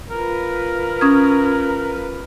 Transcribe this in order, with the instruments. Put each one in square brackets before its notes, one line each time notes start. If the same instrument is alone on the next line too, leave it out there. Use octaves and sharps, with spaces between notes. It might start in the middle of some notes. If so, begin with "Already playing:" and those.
[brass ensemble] F4 B4 [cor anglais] A#4
[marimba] C#4 D#6 G#6